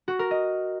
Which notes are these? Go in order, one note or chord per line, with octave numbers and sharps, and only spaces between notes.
F#4
A#4
D#5